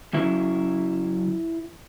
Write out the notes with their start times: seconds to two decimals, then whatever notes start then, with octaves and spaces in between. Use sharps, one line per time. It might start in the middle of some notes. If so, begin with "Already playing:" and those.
0.13 F#2 C#3 F#3 E4